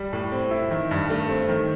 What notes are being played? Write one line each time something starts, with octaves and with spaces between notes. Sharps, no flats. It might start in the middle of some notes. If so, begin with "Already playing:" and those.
Already playing: G3
A2
C4
E4
D#3
G2
A3
C4
D#3